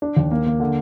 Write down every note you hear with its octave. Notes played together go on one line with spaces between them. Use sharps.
D4
D#2
A#3
A#3
D3